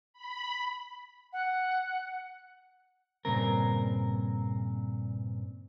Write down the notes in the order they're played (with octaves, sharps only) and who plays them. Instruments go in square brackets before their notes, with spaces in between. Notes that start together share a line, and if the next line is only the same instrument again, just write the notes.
[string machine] B5
[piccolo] F#5
[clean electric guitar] G2 A#2 C#3 C4 A#4